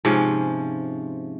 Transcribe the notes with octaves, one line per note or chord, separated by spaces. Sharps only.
G#2 C3 F3 C#4